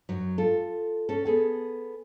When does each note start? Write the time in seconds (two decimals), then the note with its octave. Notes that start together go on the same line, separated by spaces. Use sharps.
0.09 F#2 F#3
0.38 F4 A4
1.09 C#4 A4
1.25 B3 G#4 A4